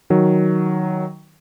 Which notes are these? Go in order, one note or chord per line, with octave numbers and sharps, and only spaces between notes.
D#3 F#3